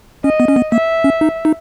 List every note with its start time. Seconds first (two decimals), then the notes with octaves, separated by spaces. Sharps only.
0.24 C#4 D#5
0.40 B3
0.48 C#4
0.56 B3
0.72 A#3 E5
1.04 C#4
1.21 D#4
1.45 D#4